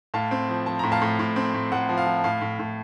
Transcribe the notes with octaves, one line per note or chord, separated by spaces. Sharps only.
A2 F5 A5
C4
F3
F3 A5
A2 A#5
F5 A5
A2
A2
C4
A2
A2 F#5
F3
F5
F3
A2 F5
A2
A2